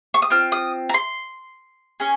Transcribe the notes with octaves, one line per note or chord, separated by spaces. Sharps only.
C#6
D#6
C4 F4 F6
D#6
A#5
C6
C#4 G#4